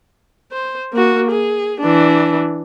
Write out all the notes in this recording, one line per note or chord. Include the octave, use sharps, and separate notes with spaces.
C5
A#3 F#4
G#4
E3 D4